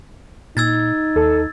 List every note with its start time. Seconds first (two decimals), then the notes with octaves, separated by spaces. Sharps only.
0.57 A#2 D#4 E6 G#6 A6
1.16 D#2 A4